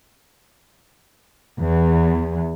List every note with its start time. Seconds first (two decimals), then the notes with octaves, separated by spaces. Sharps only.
1.60 E2